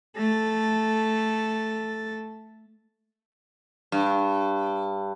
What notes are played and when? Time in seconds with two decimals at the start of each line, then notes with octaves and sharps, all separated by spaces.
0.16 A3 A4
3.92 G2